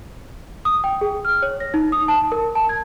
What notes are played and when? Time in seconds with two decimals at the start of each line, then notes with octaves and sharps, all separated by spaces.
0.65 D#6
0.84 G5
1.01 G#4
1.25 F6
1.42 C#5
1.60 A#6
1.74 D#4
1.92 D#6
2.08 A5
2.32 A#4
2.55 A5
2.69 G#6